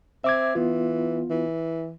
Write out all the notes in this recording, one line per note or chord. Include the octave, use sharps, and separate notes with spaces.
C4 E5 D6 G#6
E3 B3 F4
E3